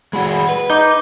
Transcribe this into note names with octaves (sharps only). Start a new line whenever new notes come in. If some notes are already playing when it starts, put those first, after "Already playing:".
G#3 F#4 B5
B4
D#4 D6 G6